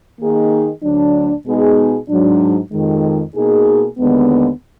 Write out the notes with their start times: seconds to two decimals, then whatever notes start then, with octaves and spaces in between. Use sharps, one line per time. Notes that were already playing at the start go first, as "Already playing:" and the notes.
0.19 D#3 A#3 D#4 G#4
0.83 D2 D3 F#3 D4
1.46 B2 G#3 B3 D#4 G#4
2.09 G#2 F#3 D4
2.72 F2 D#3 G#3
3.35 B2 A#3 D#4 G#4
3.98 D#2 D3 G#3 B3